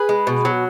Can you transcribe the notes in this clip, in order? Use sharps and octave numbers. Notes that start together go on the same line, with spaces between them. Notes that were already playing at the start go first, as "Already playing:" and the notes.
Already playing: G#4 B4
G#3
B2
F#3